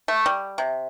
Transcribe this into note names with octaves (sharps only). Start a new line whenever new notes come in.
A3
G3
C3